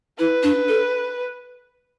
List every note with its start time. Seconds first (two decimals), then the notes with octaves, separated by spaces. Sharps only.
0.19 E4 B4
0.43 D4
0.69 A4